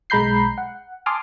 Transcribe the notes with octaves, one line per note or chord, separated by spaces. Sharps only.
B1 G#3 A#5 B5 G6 C7
F#5
G#5 A5 C6 D6 D#6 F6